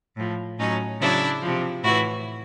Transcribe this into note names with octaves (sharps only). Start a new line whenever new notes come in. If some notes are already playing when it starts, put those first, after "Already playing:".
A2 F3
A2 F#3 C#4 D#4
C#3 F#3 D4 E4
C3 F3
A2 E3 E4 F#4